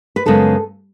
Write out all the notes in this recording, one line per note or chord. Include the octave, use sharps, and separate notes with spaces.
B4
F#2 C#3 G#3 B3 A4